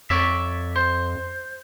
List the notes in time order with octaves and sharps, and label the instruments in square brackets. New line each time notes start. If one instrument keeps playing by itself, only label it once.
[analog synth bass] F2 [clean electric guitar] C#5 D5 E5
[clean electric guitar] C5